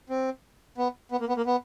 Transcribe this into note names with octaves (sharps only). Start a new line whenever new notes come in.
C4
B3
B3
A#3
B3
A#3
B3